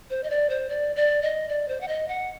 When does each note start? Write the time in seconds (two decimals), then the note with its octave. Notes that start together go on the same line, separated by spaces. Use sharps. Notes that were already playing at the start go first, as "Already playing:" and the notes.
0.10 C5
0.24 D#5
0.30 D5
0.50 C5
0.69 D5
0.96 D5
1.22 D#5
1.49 D5
1.68 C5
1.81 F#5
1.88 D#5
2.08 F#5